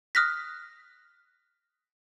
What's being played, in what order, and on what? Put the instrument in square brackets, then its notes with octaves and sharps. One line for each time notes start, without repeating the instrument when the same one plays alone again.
[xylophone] D#6 F6 F#6 A#6 B6